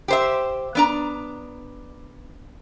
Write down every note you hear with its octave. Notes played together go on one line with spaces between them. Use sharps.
G4 C5 E5
B3 D4 A#5